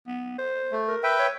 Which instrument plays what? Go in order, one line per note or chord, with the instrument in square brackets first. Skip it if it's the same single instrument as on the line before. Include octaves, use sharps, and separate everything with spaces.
[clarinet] B3
C5
[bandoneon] A3
[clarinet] A#4
[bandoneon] B4 E5 G5
[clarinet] C#5